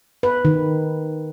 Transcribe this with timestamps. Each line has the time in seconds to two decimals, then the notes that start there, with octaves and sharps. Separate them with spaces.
0.23 B4
0.45 D#3